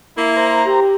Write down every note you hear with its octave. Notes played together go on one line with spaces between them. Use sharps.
A#3 E4
C5 A#5
G4